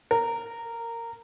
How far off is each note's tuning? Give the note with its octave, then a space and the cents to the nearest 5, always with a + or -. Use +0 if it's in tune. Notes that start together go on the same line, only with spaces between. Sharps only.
A#4 -15